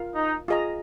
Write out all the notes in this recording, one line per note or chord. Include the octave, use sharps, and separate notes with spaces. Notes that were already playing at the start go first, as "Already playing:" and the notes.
Already playing: F4 A#4 F5
D#4
F4 G#4 D#5 A#5